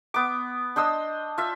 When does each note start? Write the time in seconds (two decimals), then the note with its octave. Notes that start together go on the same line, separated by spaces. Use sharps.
0.14 B3 D6
0.76 D4 C5 D#5 E6
1.38 F4 E5